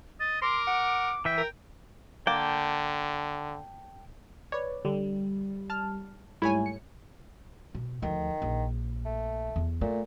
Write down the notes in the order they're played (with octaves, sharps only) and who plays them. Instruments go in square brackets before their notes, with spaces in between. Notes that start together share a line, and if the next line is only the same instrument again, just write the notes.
[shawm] D#5 [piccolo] A6
[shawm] A#4 [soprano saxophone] C6 [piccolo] D6
[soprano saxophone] F#5
[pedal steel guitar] E3 E5 [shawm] G5
[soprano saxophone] A#4
[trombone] D3 [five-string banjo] A#3 [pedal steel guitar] G5 A5
[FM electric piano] B4 D5 [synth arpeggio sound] C#5
[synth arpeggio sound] D3 [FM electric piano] G3
[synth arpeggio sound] A5 F6
[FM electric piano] G#2 G3 A3 [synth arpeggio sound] E4 C#5 G#5
[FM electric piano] C#7
[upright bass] B2
[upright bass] D2 F3 [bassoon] D#3
[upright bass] A#1
[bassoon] A3
[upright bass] E2
[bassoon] A#2 [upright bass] A3